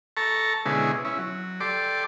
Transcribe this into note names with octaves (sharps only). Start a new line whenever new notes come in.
A4 A5 A#5 C#6
B2 D3 G#3 C#4 E4 G#4
C#4 E4
F#3
G4 A4 D5 C6 D6